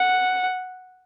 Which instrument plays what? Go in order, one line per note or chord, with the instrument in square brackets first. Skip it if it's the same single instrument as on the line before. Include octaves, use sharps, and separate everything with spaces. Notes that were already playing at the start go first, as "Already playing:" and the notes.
Already playing: [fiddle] F#5